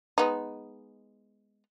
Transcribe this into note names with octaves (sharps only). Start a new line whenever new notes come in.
G#3 B3 D#4